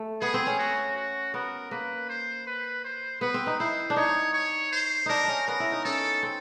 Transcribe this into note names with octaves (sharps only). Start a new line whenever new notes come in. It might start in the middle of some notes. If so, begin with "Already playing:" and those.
Already playing: A3
B3 G#4
C4
C#4
F#4
F#4
B3 A#4
A#3 B4
C5
B4
C5
B3 B4
C4
D#4
E4 C5
D4
D#4 C#5
C#5
C5
D4 D#4 A#4
C#4 D4
B3 A#4
E4
D#4
C#4 A4
C4